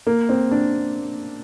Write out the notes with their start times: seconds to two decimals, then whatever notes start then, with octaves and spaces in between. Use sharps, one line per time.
0.07 A#3
0.29 C4
0.51 D4